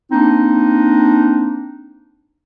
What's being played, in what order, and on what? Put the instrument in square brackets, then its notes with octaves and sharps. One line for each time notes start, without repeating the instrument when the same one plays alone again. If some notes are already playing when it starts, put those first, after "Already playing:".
[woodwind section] A#3 C4 D4 D#4